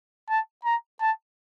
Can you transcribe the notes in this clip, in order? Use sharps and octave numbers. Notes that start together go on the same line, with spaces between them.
A5
A#5
A5